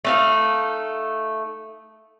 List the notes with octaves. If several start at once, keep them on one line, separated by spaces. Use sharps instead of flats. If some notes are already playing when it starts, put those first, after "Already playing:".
A3 D#4 F5